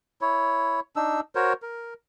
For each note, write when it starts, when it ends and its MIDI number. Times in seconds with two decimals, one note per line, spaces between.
0.21 0.80 64
0.21 0.80 73
0.96 1.20 62
0.96 1.20 63
0.96 1.20 88
1.35 1.53 66
1.35 1.53 70
1.35 1.53 72
1.35 1.53 73
1.62 1.94 70